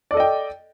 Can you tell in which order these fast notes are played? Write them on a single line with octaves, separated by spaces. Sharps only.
D5 A4 D#5 G5